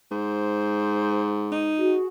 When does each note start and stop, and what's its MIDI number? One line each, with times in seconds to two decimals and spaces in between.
0.12 1.81 44
0.12 1.39 72
1.52 1.96 63
1.78 2.07 66
1.78 2.07 68